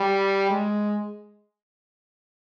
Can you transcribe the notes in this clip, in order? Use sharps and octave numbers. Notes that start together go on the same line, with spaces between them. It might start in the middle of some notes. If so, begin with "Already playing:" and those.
Already playing: G3
G#3